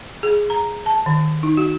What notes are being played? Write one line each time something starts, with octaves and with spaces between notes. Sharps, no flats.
G#4
A#5
A5
D#3
D#4
F#4